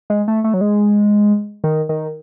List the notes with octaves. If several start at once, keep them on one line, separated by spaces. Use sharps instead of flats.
G#3
A3
A3
F#3
G#3
D#3
D#3